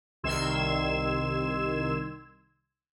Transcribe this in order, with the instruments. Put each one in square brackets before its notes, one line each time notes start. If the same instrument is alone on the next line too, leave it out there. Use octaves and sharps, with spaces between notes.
[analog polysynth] C2 D#3 C6 E6 G#6 E7